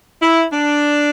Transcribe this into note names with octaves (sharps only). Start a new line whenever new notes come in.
E4
D4